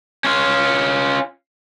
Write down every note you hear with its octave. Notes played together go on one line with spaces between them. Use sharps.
C#4 F4